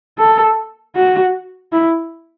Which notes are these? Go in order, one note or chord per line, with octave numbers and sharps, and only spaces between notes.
A4
F#4
E4